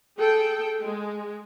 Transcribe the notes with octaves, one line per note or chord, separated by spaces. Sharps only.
G#4 A4 G5
G#3